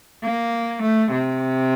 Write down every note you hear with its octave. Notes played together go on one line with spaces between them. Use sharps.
A#3
A3
C3